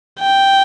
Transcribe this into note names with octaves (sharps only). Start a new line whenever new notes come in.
G5